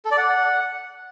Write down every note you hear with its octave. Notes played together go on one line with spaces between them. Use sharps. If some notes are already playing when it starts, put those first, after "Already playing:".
A4
D5
F#5